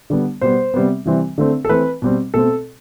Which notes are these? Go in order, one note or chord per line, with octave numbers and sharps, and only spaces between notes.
D3 G3 B3
B2 G3 B3 C5
C3 G3 B3
C3 E3 G3 C4
D3 A3 C4
A4
E3 A3 C4 B4
B2 G3 C4
B2 A3 C4 A4